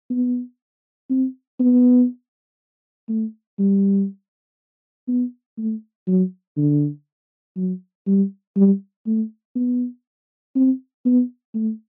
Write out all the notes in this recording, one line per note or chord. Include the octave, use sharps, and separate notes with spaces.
B3
C4
B3
A3
G3
B3
A3
F#3
D3
F#3
G3
G3
A3
B3
C4
B3
A3